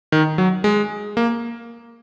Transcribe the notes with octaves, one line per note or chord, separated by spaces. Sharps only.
D#3
F#3
G#3
A#3